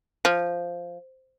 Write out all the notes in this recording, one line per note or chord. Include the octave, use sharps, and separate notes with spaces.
F3